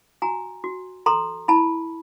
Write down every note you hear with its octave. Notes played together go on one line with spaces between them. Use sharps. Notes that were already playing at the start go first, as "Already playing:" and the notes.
F#4 G#5 A#5
F#4
A4 A#5 C6
E4 A5 B5